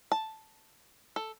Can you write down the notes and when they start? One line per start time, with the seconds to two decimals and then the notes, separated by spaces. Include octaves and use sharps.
0.12 A5
1.16 A4